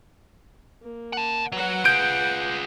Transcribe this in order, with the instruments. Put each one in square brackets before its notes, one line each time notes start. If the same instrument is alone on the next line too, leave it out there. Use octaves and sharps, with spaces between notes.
[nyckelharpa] A#3
[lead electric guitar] F#5 A5
[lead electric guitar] F#3 [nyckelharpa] B4 F#5
[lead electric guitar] F4 G#4 [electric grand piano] G6 D7